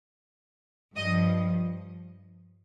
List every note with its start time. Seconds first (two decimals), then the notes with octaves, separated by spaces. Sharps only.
0.97 G2 F3 D#5